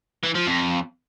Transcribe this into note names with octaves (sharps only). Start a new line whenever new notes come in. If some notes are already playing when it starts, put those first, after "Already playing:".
E3
F3
F2